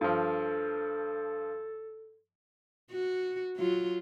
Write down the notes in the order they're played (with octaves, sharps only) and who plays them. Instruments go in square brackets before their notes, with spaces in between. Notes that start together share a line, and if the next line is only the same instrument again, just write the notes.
[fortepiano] G2 F3 [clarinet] A4
[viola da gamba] F#4
F#3 F4